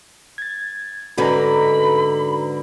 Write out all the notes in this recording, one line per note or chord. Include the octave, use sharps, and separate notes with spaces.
G#6 A6
G#2 D3 C#4 F#4 B4 A#5 B5